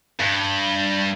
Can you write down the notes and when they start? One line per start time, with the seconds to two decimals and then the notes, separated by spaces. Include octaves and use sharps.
0.20 G2